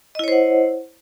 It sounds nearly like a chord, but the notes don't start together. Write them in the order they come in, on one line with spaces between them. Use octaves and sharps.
D#5 E4 C#5 C5 F#5